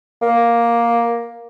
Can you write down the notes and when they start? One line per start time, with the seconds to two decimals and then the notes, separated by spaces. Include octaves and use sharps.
0.22 A#3